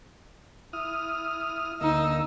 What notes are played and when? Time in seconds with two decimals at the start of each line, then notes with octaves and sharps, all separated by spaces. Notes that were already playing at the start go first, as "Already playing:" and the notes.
0.73 E4 D#6 F6
1.81 D2 A#3 D#4 E6